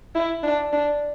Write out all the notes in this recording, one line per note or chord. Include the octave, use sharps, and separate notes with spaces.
E4
D4
D4